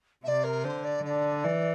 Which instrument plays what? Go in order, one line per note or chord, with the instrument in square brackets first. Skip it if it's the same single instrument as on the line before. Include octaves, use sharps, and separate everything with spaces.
[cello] C3 [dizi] D5 E5
[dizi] A#4
[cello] D3 [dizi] C5
[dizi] D5
[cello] D3 [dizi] D5
[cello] E3